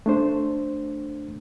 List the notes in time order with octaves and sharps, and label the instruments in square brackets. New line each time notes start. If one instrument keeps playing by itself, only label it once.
[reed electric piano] A3 D4 C5